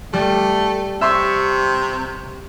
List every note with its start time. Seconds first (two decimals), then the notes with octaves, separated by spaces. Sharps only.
0.14 G3 A3
1.01 C3 E5 C6 C#6